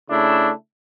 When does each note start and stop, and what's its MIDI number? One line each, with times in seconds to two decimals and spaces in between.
0.10 0.52 49
0.10 0.52 57
0.10 0.52 62
0.10 0.52 64